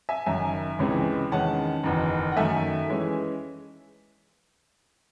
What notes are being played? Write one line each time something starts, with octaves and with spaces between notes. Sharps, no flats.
E5 G#5
F#1 F#2 D#3 F#3 E5 G#5
C#2 C3 E3 G#3 C#4
E2 D#3 G#3 C#4 F#5 A5
F#1 E2 D#3
F#5
F#2 D#3 A3 E5 G#5
E3 G#3 C#4